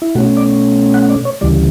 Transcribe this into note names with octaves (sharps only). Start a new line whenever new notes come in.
E4
B2 A3 C#4 F#4
D5
F#5
D5
C#5
D2 C#3 E3 G3 D5